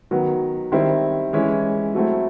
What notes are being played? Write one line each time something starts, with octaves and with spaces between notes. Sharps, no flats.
D#3 F#3 B3
D#3 G3 C4 E4
E3 G#3 C#4 E4
F#3 A3 C4 E4